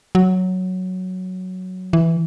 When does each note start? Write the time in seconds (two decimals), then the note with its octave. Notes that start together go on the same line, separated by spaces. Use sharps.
0.15 F#3
1.93 E3